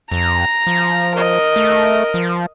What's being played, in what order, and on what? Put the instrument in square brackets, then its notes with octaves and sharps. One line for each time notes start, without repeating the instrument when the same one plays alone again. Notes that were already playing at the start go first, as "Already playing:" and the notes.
[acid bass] F2 [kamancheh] A#5
[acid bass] F3
[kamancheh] A#4 [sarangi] D#5
[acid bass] A3
F3